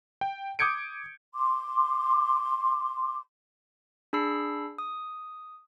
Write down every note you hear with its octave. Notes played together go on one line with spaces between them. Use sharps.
G5
D6 D#6 G6 G#6 C#7 D7
C6 D6
D4 G#4 B5 E6 C7
D#6